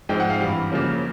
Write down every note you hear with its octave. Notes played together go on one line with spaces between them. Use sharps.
G#2 F3 G#3 C4 G5
F#5
F5
G2 E3 G3
C#3 F3 A#3 C#4